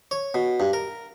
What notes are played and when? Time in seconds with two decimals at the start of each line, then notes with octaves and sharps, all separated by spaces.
0.11 C#5
0.34 B2
0.60 G2
0.73 A#4